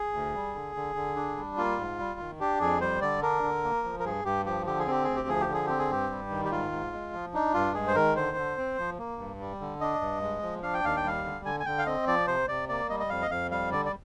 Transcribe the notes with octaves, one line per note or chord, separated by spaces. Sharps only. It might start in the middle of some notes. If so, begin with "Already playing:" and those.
Already playing: G#4
D2
G3
D3
D3
D3
D4
G3
A#3 F4
G#2
G3
D#3
D4 G4
F2 G#4
G3 C5
D3 D5
D4 A#4
D3
A#3
F3
A#4
G2 G#4
G2 G4
F3 G4
D3 G4
G#4
C4 G4
D2 G#4
G4
F3 G#4
G4
D3
G#4
C4 G4
G#4
G2 G4
G3
D#3
G4
G#2 F4
G#2
G#3
F3
D4 D#4
G2 F4
G#3 G#4
C5
D#3 A#4
D3 C5
D3
C4
F3
A#3
G2
G3
D3
D4 D#5
G2
G#3
F3
D4 F5
G5
D#2 F5
G5
G3 F5
D3
D3 G#5
G#5
D3 G5
F5
C4 D#5
F3 D5
C3 C5
C3 D5
A#3 D5
G3 D#5
D#5
F2 F5
D#5
F2 F5
G3 F5
D3 D5
D5